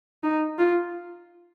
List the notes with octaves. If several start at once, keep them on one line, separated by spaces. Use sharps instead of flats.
D#4
F4